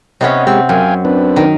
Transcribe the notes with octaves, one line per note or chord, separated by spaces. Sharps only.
C3 B3 C#4 C#5 D#5
G#3 C4 G4
F#2 F5 G5 G#5
C4 D4 B4
D#3